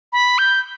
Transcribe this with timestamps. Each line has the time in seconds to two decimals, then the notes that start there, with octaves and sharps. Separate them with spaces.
0.13 B5
0.38 G6